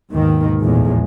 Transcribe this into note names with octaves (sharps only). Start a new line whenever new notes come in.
D#2 G#2 B2 D#3
A#1 E2 A2 F3 G#3